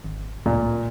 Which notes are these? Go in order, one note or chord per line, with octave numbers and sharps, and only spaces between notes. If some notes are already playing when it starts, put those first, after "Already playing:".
G#1
C#2 A#2